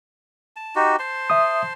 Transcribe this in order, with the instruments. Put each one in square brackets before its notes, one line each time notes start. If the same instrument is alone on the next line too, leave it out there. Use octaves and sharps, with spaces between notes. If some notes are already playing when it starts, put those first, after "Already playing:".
[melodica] A5
D#4 F#4 G4
C5 A5 C6
[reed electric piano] E5 D#6